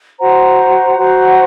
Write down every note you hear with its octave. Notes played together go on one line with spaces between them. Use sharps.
F#4 C5 F#5 A#5
F#4 C5 F#5 A#5